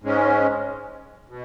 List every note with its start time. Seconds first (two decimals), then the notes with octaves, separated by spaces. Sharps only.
0.02 G#2 G#3 C#4
1.29 B2